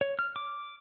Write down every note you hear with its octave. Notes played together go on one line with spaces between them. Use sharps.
C#5
F6
D6